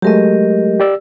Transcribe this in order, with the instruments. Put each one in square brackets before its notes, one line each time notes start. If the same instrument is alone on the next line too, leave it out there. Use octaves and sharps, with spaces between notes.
[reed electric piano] F#3 G#3 A3 [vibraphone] G4 A#4 D#5
[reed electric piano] G4 D5 E6